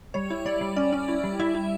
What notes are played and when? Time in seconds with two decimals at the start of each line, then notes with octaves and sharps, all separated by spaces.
0.14 G3 C#5
0.30 E4
0.46 G3 D5
0.61 G3
0.76 C#4 D5
0.93 C#4
1.08 E4
1.24 G3
1.39 G3 E4 E5
1.55 E4